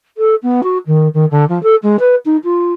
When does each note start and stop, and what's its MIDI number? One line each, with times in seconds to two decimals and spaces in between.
0.18 0.35 69
0.43 0.61 59
0.63 0.78 66
0.87 1.08 51
1.14 1.25 51
1.31 1.45 50
1.49 1.62 53
1.63 1.75 69
1.83 1.97 56
2.00 2.15 71
2.26 2.37 63
2.44 2.73 65